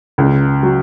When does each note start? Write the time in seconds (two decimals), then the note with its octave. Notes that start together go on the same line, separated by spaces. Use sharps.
0.18 C#2
0.63 F#3